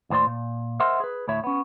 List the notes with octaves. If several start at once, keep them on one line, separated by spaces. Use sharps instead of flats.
D#2 A2 C5 D5 C6
A#2
A#4 C5 D#5 E5 F#5 C6
G#4 B4
D2 A2 C#5 E5
B3 C#4